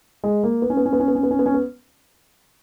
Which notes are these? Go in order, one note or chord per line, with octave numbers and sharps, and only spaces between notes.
G#3
A#3
B3
C#4
B3
C#4
B3
C#4
B3
C#4
B3
C#4
B3
C#4
B3